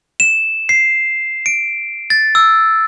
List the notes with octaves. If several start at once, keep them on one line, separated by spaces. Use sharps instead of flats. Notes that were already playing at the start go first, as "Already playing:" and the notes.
E7
C7
D7
A6
E6